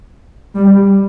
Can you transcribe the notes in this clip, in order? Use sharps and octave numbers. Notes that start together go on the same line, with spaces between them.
G3